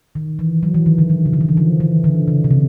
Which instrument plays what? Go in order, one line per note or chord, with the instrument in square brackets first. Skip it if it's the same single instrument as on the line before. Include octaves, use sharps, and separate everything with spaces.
[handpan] D#3
E3
F#3
E3
D#3
D3
D#3
C#3
D3
D#3
E3
F3
E3
D3
C#3
C3
C#3